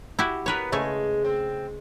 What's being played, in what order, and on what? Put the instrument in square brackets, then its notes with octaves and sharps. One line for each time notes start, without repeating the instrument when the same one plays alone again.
[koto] E4 F#4 G4
[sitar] B3 [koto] A#4 B4 C#5
[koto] C#3 A3 G#5 [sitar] G#3
[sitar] C4